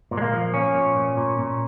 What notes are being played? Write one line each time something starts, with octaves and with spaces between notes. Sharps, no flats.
A#2
G#3
A#3
F3
F3 C#4
A#2
A#2
A#2
A#2